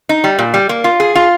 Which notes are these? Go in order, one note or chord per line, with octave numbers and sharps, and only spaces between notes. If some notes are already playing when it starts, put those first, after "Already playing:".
D#4
G3
A#2
G3
A#3
F4
G#4
F4